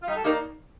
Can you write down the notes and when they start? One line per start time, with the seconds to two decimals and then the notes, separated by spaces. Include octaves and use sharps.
0.03 F4
0.07 G3 D#4
0.16 A4
0.24 A#3 D#4 G4 A#4 D5